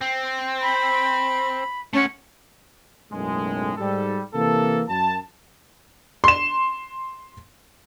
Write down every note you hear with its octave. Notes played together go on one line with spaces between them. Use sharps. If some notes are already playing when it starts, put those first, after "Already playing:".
C4
B5
A3 C#4 F#5
B1 F#2 A2 G#3
G#2 G3 A4
C3 E3 A#3 A4
F#2 A5
C6 E7